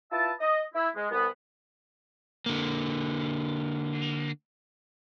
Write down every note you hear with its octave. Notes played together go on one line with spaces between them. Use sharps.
E4 F4 B4 E5 A5
D#5
E4
G#3
C2 B3
D3 A#3